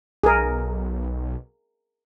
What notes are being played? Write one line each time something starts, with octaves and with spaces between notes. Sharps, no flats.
B1 G#4 A#4